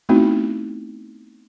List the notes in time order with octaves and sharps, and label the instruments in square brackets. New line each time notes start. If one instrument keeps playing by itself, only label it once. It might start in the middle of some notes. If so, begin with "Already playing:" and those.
[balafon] A3 B3 C4 D#4 E4 F#4